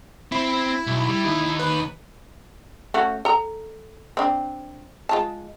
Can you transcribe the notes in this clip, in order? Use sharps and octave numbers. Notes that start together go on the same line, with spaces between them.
C4 E4
B1
G3
D#2 D#4
B4
A3 C#4 F#4
A4 A#5
C4 D4
G#3 F4 A5